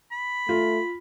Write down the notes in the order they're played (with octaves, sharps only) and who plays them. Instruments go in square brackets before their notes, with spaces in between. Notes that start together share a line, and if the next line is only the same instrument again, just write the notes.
[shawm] B5
[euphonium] A3 [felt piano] F4